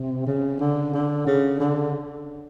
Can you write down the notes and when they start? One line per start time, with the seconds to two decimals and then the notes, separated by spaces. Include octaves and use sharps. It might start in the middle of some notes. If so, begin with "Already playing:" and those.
Already playing: C3
0.27 C#3
0.60 D3
0.93 D3
1.27 C#3
1.60 D3